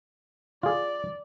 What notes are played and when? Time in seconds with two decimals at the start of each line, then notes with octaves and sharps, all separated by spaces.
0.63 F4 G#4 D5